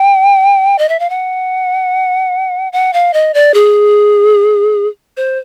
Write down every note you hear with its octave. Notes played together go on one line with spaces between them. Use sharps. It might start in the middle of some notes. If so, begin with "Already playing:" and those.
Already playing: G5
D#5
E5
F5
F#5
F#5
F5
D#5
D5
G#4
C5